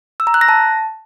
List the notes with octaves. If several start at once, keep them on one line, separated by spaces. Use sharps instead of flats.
E6
A#5
F#6
A#6
A5